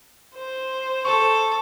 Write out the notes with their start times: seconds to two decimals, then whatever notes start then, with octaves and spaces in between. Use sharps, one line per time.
0.35 C5
1.05 A4 C#6